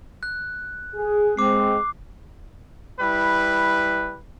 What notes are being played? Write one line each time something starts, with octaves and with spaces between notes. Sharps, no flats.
F#6
G#4
G#3 C4 D6 C7
G3 E4 B4